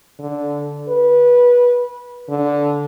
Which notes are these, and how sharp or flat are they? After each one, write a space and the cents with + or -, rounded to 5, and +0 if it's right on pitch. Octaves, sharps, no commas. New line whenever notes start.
D3 -10
B4 -20
D3 -15